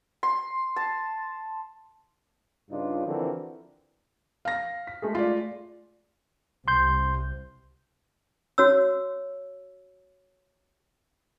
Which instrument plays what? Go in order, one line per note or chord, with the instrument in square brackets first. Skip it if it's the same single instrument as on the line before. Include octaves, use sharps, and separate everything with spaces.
[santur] C6
A5
[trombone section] G2 C#3 D4 D#4 F4
D3 E3 F3 C4 F#4 A#4
[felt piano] F5 A#6
[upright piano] B6
G#3 A3 G#4
[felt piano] F4 D5
[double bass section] C2 C3 [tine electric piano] C6 G6
[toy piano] F#4 C#5 E6